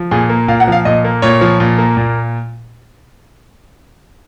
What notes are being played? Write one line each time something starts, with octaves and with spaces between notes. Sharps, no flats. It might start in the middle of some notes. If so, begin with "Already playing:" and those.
Already playing: F3
A#2 G#4
A#3
A#2 F5
F#5
F3 F5
A#2 D#5
A#3
A#2 C#5
F3
A#2
A#3
A#2